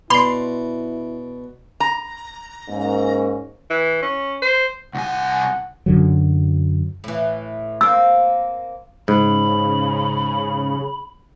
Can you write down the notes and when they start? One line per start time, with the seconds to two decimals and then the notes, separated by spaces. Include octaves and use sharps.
0.10 B2 E4 D5 B5 C6
1.80 A#5
2.69 G#2 A#3 C#4
3.70 E3
4.02 C#4
4.42 C5
4.95 C2 F#5 G#5
5.86 F#2 D3 F#3
7.04 A2 E3
7.81 A#3 C4 E6
9.08 G#2 C#3 B5